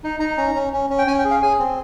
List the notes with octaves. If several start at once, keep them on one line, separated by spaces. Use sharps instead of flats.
D#4
D#4 A#5
C#4 A#5
C#4
C#4
C#4
G5
C#4 G#5
G5
G#4
F5
G#4 G#5
C4